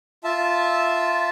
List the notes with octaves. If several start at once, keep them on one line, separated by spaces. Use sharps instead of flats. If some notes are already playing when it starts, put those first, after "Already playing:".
F4 E5 A5